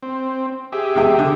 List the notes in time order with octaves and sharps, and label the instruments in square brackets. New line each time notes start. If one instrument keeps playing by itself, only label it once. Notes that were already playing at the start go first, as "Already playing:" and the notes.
[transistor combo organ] C4
G4 G#4 E5
[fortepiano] E2 G#3 G5
D3